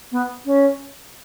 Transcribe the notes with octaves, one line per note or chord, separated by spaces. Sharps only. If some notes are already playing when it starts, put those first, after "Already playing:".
B3
C#4